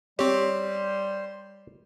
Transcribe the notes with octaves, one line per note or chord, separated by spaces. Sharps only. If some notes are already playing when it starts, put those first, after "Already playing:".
G3 C4 G4 C5 C#5 C6